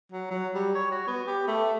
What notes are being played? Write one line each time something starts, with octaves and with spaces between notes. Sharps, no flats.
F#3
F#3
G3
C#5
F#4
B3
G4
A3